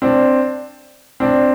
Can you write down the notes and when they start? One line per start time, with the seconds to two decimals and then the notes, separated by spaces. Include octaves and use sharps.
0.02 C4 D4
1.20 C4 D4